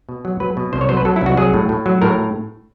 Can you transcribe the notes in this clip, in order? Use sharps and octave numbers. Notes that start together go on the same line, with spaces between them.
B2
F#3
F#3 B4
B2
C2 C5
C#5
F#3 C5
B4
F#3 A4
E4
C2 F#4
F#3 G#4
A2
A2
F#3
A2 A#4